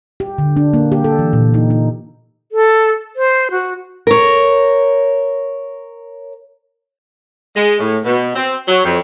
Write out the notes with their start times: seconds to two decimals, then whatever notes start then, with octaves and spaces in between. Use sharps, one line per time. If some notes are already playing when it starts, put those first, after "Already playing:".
0.20 G4
0.38 D3
0.57 D4
0.74 A#3
0.92 G4
1.04 A4
1.19 E3
1.33 A#2
1.54 D#4
1.70 D#4
2.52 A4
3.16 C5
3.51 F#4
4.07 A#4 C#5
7.56 G#3
7.80 A2
8.04 B2
8.35 C4
8.68 F#3
8.84 F2